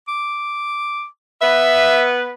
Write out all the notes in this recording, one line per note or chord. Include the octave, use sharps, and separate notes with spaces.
D6
B3 B4 E5